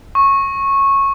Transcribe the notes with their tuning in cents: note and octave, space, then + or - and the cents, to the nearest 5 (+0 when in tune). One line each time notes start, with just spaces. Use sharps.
C#6 -15